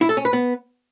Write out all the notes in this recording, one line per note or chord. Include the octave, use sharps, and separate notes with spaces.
E4
A4
C#4
B4
B3